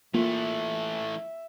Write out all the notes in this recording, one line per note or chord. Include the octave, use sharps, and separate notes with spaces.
E3 A3 A#3 F4 E5